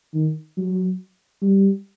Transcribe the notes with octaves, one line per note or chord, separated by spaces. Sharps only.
D#3
F#3
G3